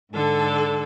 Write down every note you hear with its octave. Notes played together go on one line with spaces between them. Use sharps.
G#2 D3 A4